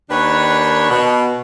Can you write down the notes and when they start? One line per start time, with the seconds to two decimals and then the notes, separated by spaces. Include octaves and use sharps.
0.10 D#2 D#3 D4 B4 C#5
0.90 B2